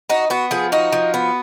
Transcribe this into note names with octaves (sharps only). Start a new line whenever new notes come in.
D#4 F#4
B3 F#4
F3 G#4
D#4 F#4
F3
B3